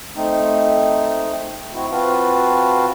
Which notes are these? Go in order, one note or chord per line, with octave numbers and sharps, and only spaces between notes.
A3 C4 D#4
C4 E4 F#4
C4 F4 F#4 B4 F5 A5